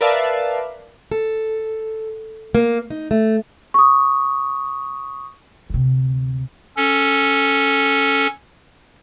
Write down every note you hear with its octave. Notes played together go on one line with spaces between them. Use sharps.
A#4 B4 D5 E5 F5 A5
A4
A#3
D#4
A3
C#6 D#6
D2 C3
C#4 A4